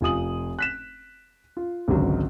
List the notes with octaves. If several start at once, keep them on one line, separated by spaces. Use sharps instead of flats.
F1 F4 G#5 D#6 F#7
F#6 B6 E7
F4
G#1 C#2 D3 F#3 F#4